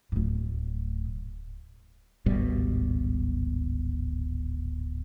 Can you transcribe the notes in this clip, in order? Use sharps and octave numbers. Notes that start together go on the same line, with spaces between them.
D1 A2
D1 G#1 B2 G3